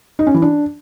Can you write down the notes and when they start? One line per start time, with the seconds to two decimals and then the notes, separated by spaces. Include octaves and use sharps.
0.19 D#4
0.27 C#4
0.34 E3
0.42 D4